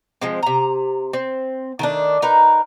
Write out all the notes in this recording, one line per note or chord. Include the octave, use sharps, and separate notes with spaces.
F3 G#3 C4
C3 A#5
C4
D#3 A3 D4
D#4 A#4 B4